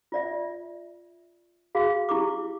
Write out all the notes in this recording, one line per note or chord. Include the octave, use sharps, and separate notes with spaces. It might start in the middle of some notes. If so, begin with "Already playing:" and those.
F4 D5 E5
F#4 G#4 F5
E4 G4 C#6 D6